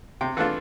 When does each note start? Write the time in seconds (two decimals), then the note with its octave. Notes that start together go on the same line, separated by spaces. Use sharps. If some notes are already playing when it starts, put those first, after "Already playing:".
0.21 C3 G5
0.37 E3 A3 D4 F4 F#5